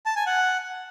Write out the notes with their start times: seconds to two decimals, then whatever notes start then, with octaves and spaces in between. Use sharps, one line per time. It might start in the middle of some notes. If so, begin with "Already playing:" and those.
0.06 A5
0.16 G#5
0.26 F#5